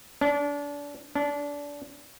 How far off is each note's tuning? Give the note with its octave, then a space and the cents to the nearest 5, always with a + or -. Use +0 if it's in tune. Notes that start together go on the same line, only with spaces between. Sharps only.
D4 -30
D4 -25